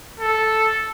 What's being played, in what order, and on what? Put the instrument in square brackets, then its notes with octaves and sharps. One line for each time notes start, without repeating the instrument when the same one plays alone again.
[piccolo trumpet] A4